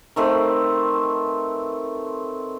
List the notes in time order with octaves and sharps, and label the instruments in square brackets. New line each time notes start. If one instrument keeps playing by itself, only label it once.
[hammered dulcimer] D#3 A3 C4 B4